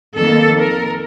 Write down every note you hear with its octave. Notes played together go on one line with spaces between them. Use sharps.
F2 D#3 A#3 A4
A#4